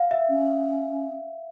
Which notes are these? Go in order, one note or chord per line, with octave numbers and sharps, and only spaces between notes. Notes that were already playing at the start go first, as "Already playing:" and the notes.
Already playing: F5 F#5
E5
C#4